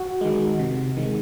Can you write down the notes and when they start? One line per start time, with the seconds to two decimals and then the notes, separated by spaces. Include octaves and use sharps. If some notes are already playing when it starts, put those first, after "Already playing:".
Already playing: F#4
0.21 D#3 G#3
0.59 C3
0.97 D#3 G#3